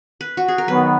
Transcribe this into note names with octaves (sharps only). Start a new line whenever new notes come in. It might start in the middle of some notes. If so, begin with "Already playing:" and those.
B4
F#4
G#4
A#4
D#3 F#3 B3 B4